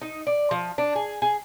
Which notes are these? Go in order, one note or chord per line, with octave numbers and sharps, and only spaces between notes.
D#4
D5
F3
D4
G#4
G#4